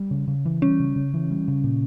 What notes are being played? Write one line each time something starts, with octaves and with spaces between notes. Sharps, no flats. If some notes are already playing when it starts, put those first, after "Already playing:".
Already playing: G3
C#3
C#3
E3
G3 C#4
C#3
C#3
E3
G3
C#3
A#2